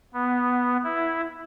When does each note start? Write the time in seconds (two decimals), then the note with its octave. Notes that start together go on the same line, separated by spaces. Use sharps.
0.14 B3
0.84 E4